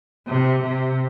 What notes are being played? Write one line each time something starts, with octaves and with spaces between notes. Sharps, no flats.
C3
C3